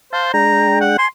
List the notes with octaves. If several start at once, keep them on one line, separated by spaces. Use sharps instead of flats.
C5 F5 A5
G#3 D4 G5 A#5
F#5
G#5 C6